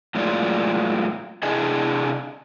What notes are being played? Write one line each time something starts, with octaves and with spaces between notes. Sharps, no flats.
A2 F#3 G#3 A#3 F4 D5
C3 D4 E4 G#4 D#5